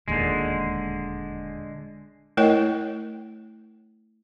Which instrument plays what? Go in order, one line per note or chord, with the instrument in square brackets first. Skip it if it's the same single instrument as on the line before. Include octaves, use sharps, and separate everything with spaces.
[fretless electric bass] E1 D#2 A#2 [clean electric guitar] D3 G#3
[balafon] A3 E4 A#4 C#5 D#5 G5